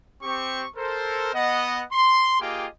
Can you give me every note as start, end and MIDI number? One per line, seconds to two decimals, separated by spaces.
0.23 0.64 60
0.23 0.64 67
0.23 0.64 85
0.76 1.30 69
0.76 1.30 70
0.76 1.30 72
1.33 1.82 59
1.33 1.82 75
1.33 1.82 78
1.93 2.40 84
2.41 2.66 58
2.41 2.66 65
2.41 2.66 67
2.41 2.66 68
2.41 2.66 75
2.41 2.66 79